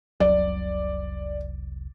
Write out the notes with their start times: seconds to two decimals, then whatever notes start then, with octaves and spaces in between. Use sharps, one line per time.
0.20 F1 C2 F#3 D5